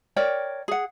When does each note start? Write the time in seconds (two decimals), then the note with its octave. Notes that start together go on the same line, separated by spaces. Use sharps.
0.16 A#4 C#5 D5 G5
0.68 G#4 F#5